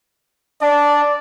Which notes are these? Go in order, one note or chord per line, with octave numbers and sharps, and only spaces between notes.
D4 D5